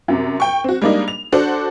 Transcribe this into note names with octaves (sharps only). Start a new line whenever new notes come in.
F#2 C3
G5 C#6
C4 F#4
G3 G#3 A#3 D4 D#4
F7
D4 F#4 A4 C5